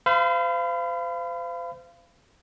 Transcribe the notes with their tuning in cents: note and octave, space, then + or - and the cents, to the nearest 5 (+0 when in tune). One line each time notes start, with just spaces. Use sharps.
C5 -35 F5 -25 B5 +30